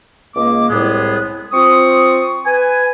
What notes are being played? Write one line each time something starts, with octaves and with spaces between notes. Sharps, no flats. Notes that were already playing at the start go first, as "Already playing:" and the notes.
C#2 A#3 D#5 D6
C2 A2 G3 G#3 B3 G#4
C4 F4 C#6 D#6
B4 G#5